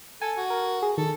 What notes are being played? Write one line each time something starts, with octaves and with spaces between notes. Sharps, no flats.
A4 G#5
F#4
A#4
G#4
D#3 A4